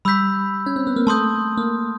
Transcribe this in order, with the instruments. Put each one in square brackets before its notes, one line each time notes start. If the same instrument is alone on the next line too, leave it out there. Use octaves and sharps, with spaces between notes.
[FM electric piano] G3 [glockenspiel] B5 E6 G6 B6
[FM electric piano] C#4
C4
B3
A#3
[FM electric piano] A3 [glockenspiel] A5 C6 D#6 G6
[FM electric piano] A#3